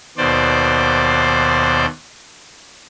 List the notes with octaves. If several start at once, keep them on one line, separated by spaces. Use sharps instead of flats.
D#2 B2 C5 D5